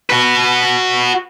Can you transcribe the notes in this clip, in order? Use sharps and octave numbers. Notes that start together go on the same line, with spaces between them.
F#4 B4